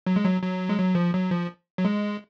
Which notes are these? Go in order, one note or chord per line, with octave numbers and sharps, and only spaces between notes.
F#3
G#3
F#3
F#3
G#3
F#3
F3
F#3
F3
F#3
G#3